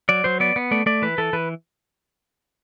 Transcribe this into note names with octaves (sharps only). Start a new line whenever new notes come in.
F#3 D5
F#3 C5
B3 D5
B3
A3 D5
A3 D5
E3 B4
E3 A4
E3 B4